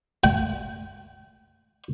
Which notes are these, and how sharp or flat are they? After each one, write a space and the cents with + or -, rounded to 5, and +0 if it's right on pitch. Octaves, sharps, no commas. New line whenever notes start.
G5 -30